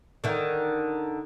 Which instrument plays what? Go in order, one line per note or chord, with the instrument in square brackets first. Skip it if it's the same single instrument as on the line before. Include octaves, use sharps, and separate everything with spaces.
[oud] D3 D#3